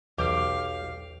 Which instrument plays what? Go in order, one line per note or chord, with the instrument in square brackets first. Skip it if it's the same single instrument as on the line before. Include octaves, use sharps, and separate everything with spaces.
[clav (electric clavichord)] B1 [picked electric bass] E2 [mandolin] G4 G5 F6 [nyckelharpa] F5